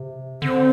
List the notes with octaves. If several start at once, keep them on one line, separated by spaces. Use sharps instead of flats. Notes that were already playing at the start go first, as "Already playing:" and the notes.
Already playing: C3
D3 C4